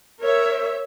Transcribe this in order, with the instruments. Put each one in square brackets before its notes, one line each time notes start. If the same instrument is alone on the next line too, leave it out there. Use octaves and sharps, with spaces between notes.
[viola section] A#4 C#5 E5